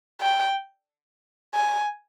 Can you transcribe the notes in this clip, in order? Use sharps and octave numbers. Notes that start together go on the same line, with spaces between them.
G5
G#5